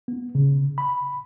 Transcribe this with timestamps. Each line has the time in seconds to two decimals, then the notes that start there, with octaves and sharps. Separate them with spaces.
0.08 B3
0.35 C#3
0.78 B5